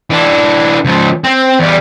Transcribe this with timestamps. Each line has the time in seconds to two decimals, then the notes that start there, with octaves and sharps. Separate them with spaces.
0.10 E3 D4
0.85 C#2 F3
1.24 C4
1.59 E2 G3